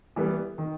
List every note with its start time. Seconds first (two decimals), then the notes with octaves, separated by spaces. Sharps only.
0.16 E3 G3 B3
0.58 D#3